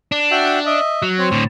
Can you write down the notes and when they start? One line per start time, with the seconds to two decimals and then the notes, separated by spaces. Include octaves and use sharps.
0.12 D4
0.31 F#4 E5 G5
0.66 D#5 E5
1.02 F#3
1.18 C4 C#5
1.32 A2 D3